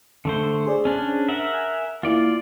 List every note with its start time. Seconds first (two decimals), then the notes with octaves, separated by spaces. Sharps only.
0.25 D3 A3 C5
0.67 G#4 C5 D5
0.85 C#4 D4
1.28 A#4 E5 F#5
1.54 G#5
2.03 A#3 E4 F4 D5 F5